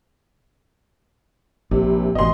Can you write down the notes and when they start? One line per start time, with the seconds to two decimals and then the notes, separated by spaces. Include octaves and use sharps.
1.71 A#1 C3
2.15 A1 B2 D#5 C6